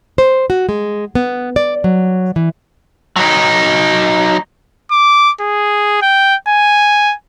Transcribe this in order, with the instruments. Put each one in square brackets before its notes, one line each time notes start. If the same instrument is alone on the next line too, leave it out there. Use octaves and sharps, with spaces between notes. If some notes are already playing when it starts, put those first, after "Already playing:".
[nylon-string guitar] C5
F#4
G#3
B3
D5
F#3
E3
[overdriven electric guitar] F#3 D#4
[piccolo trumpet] D6
G#4
G5
G#5